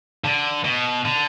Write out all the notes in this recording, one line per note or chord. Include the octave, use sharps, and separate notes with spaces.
D3
B2
D3